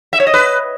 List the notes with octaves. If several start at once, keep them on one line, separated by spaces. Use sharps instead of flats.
E5
C#5
D#5
B4